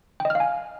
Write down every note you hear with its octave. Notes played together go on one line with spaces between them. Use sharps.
G5
D#5
F6
F5
G#5